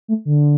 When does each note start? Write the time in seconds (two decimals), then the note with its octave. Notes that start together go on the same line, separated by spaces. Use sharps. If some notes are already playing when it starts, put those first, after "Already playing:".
0.08 A3
0.25 D3